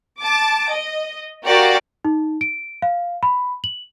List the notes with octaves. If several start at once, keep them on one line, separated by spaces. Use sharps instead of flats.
A5 D6
D#5
F#4 G4 A#4 D5 F5
D#4
D7
F5
B5
F#7